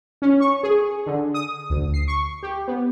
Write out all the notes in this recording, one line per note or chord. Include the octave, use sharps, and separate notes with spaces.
C#4
C#6
G#4
D3
D#6
D2
C7
C#6
G4
B3